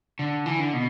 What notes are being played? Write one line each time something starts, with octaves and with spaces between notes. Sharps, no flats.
D3
E3
D3
B2